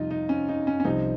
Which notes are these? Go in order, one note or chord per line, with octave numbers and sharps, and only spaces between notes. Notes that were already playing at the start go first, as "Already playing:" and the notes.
Already playing: F2 C3 G3 D#4 F4
D#4
C#4
D#4
C#4
C#4
C2 C3 F3 C4 D#4